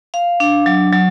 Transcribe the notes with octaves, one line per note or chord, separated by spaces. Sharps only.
F5
D4
F#3
F#3